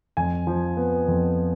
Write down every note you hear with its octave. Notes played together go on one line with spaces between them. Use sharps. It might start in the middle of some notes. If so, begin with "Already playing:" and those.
F2 G#5
F3
B3
F2